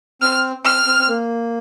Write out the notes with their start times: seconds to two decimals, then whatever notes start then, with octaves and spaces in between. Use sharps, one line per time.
0.22 C4 F6
0.65 C4 F6
0.87 C4
0.99 C4
1.09 A#3